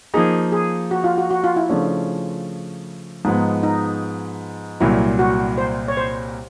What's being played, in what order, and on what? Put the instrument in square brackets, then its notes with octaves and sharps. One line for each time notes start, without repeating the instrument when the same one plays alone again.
[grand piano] F3 A#3 D#4 [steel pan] G#4
[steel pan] G#4
F#4
F4
F#4
F#4
F4
E4
[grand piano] C#3 F3 A3 C#4 [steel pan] D4
[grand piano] G#2 F3 G#3 B3 [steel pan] D#4
[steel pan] D#4
[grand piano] C2 A#2 F#3 [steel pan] E4
[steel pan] F#4
C5
C#5
C5